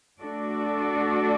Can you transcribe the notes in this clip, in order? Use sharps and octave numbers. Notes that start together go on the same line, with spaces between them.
A3 D4 F#4 A4 D5